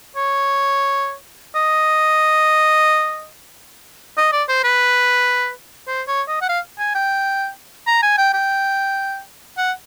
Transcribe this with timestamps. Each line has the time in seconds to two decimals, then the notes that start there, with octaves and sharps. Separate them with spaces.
0.16 C#5
1.56 D#5
4.18 D#5
4.32 D5
4.49 C5
4.64 B4
5.88 C5
6.08 C#5
6.28 D#5
6.42 F#5
6.49 F5
6.79 G#5
6.95 G5
7.87 A#5
8.03 G#5
8.18 G5
8.33 G5
9.57 F#5